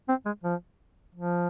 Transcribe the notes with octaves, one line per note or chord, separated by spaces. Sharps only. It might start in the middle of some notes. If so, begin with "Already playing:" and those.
C4
G#3
F3
F3